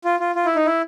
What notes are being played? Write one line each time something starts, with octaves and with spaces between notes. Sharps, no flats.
F4
F4
F4
E4
D#4
E4